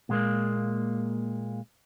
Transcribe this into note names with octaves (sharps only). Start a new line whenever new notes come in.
A#2 G#3 A#3